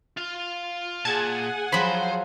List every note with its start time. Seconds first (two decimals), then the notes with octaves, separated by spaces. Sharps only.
0.17 F4 F5
1.05 A#2 G#4 F#5 G#5 A5 G#6
1.72 F3 F#3 C5 B5